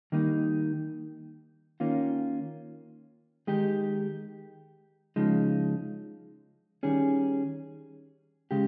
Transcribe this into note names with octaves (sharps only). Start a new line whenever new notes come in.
D#3 G3 A#3 D#4
D#3 A#3 C#4 F4
D#3 G#3 D#4 G4
C#3 F3 G#3 D#4
D#3 G3 C#4 G#4
C#3 G#3 G4